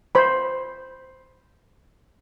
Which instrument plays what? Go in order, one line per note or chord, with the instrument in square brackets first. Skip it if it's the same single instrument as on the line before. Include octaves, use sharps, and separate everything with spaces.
[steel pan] C5 B5